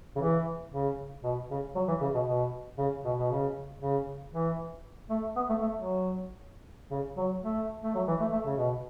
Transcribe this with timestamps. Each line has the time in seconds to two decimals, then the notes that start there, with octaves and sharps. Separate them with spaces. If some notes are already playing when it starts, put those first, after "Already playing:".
0.16 C#3
0.20 E3
0.73 C#3
1.23 B2
1.50 C#3
1.75 F#3
1.88 E3
2.01 C#3
2.14 B2
2.27 B2
2.78 C#3
3.04 B2
3.18 B2
3.30 C#3
3.81 C#3
4.33 E3
5.10 A3
5.36 B3
5.49 A3
5.62 A3
5.75 F#3
6.91 C#3
7.17 F#3
7.43 A3
7.83 A3
7.95 F#3
8.08 E3
8.20 A3
8.32 A3
8.45 C#3
8.57 B2